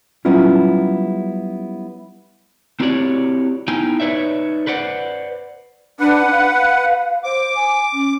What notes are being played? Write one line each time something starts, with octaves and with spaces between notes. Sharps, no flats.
F#3 G3 B3 C#4 E4 F4
C4 E4 F#4 G4 C#5 D5
B3 D#4 E4 G5 G#5
D#4 B4 C#5 D5 E5
B4 C5 D5 F#5
D4 B4 F#5
F5
C5 D6
G#5
C#4